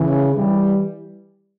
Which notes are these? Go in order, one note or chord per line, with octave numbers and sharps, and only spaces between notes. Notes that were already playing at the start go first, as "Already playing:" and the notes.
Already playing: C#3 E3
E3 G3